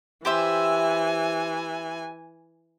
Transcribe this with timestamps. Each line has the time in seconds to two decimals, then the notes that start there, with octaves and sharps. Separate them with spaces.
0.25 E3 G4 C5 E5 G#5